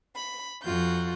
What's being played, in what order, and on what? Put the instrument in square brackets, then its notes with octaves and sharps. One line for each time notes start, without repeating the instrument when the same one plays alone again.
[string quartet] B5
F2 F4 F#4 G6